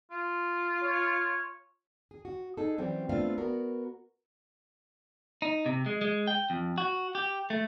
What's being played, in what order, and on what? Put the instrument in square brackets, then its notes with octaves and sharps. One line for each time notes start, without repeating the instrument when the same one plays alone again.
[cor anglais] F4
[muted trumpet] C#5
[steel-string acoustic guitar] G#4
F#4
D#4 G#4 A4
E3 F#3 G3 C4 C#4
A3 B3 C4 D4 F4 F5
B3 F#4 A#4
[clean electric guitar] D#4
C3
G#3
G#3
G5
F2
F#4
G4
A3